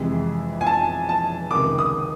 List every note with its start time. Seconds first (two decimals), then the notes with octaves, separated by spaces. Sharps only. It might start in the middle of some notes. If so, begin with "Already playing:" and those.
Already playing: F2 C3 E3 G#3
0.61 G#5
0.67 A5
1.09 A5
1.51 C#2 C3 D#3 D6
1.78 D#6